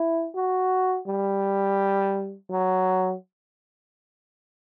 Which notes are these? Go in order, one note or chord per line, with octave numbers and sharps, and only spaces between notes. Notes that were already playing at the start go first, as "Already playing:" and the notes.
Already playing: E4
F#4
G3
F#3